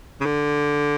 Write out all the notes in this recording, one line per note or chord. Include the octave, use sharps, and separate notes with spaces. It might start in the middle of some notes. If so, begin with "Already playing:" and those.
C#3
D3